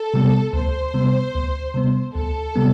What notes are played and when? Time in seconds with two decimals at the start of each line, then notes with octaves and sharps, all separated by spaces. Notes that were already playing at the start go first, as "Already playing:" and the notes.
Already playing: A4
0.14 C3 G3 B3
0.53 D2 C5
0.94 C3 G3 B3
1.34 D2
1.75 C3 G3 B3
2.15 D2 A4
2.56 C3 G3 B3